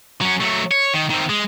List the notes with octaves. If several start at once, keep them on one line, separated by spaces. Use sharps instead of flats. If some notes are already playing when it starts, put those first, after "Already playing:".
F#3 C#4
F#3 A3
C#5
D#3
D#3 C4
G#3